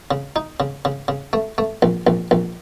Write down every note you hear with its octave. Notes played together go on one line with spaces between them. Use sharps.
C#3
D#4
C#3
C#3
C#3
A3
A3
A#1
A#1
A#1